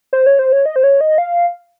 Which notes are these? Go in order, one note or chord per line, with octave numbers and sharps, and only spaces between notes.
C5
C#5
C5
C#5
D#5
C5
C#5
D#5
F5